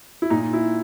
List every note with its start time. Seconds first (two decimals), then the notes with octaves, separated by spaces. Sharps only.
0.22 E4
0.30 A#2 D#4
0.53 E4